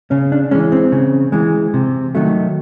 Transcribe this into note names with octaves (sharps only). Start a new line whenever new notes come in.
C#3 C#4
D4
E3 G#3 C#4
C4
C#3
E3 G#3
C3
D#3 F#3 A3